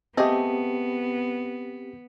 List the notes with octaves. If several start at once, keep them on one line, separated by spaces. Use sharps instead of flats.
A3 B3 C4 G4 G#4 D#5